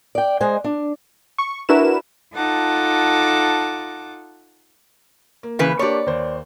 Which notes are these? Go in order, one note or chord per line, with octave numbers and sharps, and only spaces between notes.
D5 G5
G#3 C5 D#5 G#5
D4
C#6
D4 E4 F#4 A#4 B4 E7
D#4 F4 A4 F#5 A5 D6
A#3
C#3 E3 B4
A#3 D4 G4 C#5 D5
D#2 C5